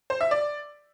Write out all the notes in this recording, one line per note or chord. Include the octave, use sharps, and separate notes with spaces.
C5
E5
D5